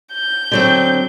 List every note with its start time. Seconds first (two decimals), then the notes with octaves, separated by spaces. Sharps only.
0.13 G6
0.52 D3 F#3 C4